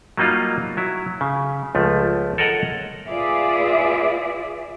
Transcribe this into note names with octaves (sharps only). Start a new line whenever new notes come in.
F#3 G3 A#3 D#4 F4
F#3 E4
C#3
C#2 F3 A3
A4 A#4 C#5 D#5 F#5 A#5
F4 G#4 B4 D5 E5